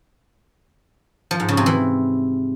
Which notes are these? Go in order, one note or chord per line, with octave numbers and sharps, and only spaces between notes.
F3
G#2
C#3
C3
E3